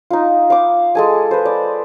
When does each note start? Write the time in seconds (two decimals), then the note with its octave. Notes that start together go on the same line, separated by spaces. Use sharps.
0.11 D#4 F4
0.50 F5 D6
0.95 G#3 A4 G#5
1.31 B4 C5
1.45 D5